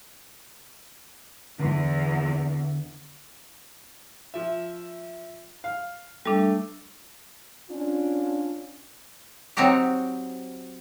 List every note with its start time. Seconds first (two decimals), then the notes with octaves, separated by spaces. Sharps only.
1.59 E2 D3
4.34 F3 E5
5.64 F5
6.26 G3 A3 D4
7.70 C#4 D4 F4
9.57 F#3 C4 D#4 F#4 G4